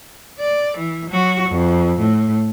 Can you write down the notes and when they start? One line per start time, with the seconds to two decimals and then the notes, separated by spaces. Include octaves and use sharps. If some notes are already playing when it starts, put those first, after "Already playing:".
0.39 D5
0.77 E3
1.09 F#3 F#4
1.49 F2
1.99 A2